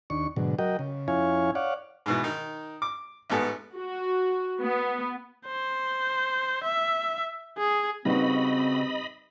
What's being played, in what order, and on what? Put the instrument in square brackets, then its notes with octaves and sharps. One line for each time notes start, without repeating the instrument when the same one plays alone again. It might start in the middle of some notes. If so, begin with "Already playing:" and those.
[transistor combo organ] D#2 D4 C#6
G#2 B2 D3 F#3
F#3 F#4 A#4 D#5 G5
C#3
F2 C#4 E4 C#5 F5 G#5
C#5 D5 F5 F#5
[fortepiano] G#2 B2 E3
D#3 D#4
D6
A1 G#2 B3 A4
[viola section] F#4
B3
[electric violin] C5
E5
G#4
[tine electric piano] C#3 F#4 [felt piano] G3 D#4 B4 [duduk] C4 [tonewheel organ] D#5 B5